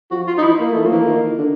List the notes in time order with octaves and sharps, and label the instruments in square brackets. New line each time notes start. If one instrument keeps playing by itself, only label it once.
[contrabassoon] F3 [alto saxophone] F#4
[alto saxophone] F4
D#4
[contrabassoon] E3 [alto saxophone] E4
[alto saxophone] A#3
[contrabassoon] E3 [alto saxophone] A3
[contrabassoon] F3 [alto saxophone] A#3
[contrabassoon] E3
D#3
D3